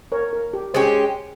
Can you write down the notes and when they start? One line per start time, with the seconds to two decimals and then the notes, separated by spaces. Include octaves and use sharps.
0.12 A#4 C#5
0.33 A#4
0.54 G4
0.74 G#3 C#4 G4 C5